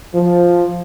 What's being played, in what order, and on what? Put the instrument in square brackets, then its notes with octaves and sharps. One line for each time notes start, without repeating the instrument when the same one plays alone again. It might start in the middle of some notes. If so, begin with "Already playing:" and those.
[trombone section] F3